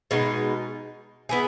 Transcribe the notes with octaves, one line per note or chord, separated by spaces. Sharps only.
B2 G#3 D#4
B3 E4 G#4